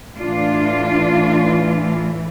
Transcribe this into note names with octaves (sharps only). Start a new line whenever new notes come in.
A2 E3 D4 F4